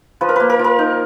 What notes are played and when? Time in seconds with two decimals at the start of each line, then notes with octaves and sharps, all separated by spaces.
0.21 F3 B4
0.29 A#4
0.36 A#3 B4
0.50 A#4
0.59 F3
0.64 A#4
0.79 D#4